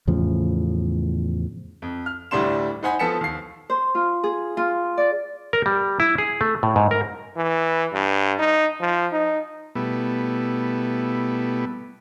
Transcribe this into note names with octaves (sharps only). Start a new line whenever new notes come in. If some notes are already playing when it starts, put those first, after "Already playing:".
E2 A2 C#3 F3
F2
F6
D2 A2 G3 D4 C6 E7
D#4 C5 F#5 G#5 B5
F3 B3 A4 B6 C#7 E7
D#2 C7
C5
F4
G#4
F4
D5
A#4
G3
E4
G#4
A3
A2
G#2
A#4
E3
G2
D#4
F3
D#4
B2 G3 A3 B3 E4